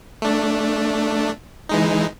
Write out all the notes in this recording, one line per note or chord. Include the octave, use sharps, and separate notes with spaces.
A3 D4
E3 G#3 D#4